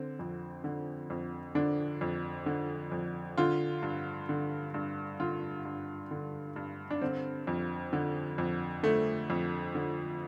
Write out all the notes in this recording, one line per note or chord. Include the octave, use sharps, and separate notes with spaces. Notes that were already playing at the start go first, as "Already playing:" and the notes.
Already playing: D3 C4
F2
D3
F2
D3 D4
F2
D3
F2
D3 F4
G2
D3
G2
D3 F4
G2
D3
G2
D4
D3 C4
F2
D3
F2
D3 A3
F2
D3